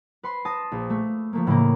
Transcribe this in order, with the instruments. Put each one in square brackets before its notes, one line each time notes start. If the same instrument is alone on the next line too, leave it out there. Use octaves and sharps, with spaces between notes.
[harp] B4 C6
A5 D#6 A#6
A#1
A3
F3 A3 A#3
A2 C#3 E3 A3 A#3